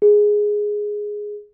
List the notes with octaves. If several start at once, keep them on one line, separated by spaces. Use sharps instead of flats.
G#4